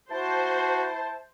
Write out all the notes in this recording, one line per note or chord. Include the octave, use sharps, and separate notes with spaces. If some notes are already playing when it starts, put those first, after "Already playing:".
E4 F#4 C5 A5